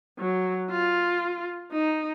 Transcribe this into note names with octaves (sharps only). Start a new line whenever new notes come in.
F#3
F4
D#4